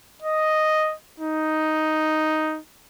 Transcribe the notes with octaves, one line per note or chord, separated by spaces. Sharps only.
D#5
D#4